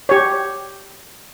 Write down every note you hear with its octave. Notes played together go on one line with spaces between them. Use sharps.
G4 C#5